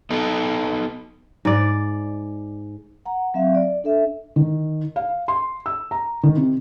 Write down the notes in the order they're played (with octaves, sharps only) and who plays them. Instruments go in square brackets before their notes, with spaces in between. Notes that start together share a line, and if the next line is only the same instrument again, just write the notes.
[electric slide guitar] B3 D#4 A4
[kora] G#2 D5
[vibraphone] F#5 A#5
F#3 C4 E5 F5
D5
D4 A4 E5
[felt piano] D#3
F5
C6
E6
A#5
D#3
C3